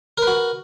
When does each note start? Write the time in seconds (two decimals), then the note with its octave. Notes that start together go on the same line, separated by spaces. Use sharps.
0.18 A#4
0.22 B4
0.27 F#4